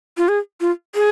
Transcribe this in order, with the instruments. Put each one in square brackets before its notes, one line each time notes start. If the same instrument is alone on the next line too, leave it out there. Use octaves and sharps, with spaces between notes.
[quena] F4
G#4
F4
G#4